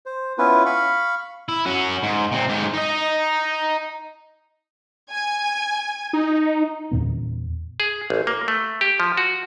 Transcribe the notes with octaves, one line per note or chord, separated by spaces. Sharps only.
C5
B3 C#4 E4 F4 B4
F5 B5 C#6
E4
C#4 F#4
G#2
A#2 C4
G#2 G4
D#4 D#5
G#5
D#4
E2 A#2 B3
G#4
A1
A#3
A3
G4
F3
F#4